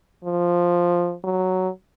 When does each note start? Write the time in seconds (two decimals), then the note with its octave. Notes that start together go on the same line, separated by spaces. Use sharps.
0.25 F3
1.24 F#3